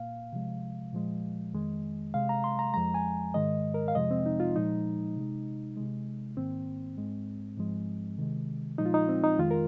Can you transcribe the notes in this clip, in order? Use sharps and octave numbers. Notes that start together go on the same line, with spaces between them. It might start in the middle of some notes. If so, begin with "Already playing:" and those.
Already playing: A#2 A#3 F5
C3 F3 G#3
A#2 F3 G#3
F2 D#3 G#3
C3 G#3 F5
A#5
C6
A#5
F2 F3 G#3 A#5
G#5
G#2 D#3 G#3 D#5
A#4
F5
F2 C3 F3 G#3 D#5
C4
D#4
F4
A#2 F3 G#3 D#4
C3 G#3
C3 G#3
G#2 D#3 A#3 C4
G#2 G#3
G#2 F3 G#3
C3 D#3 G#3
A#2 F3 G#3 D#4
F4
D#4
C4
D#4
F2 D#3 G#3 F4
A#4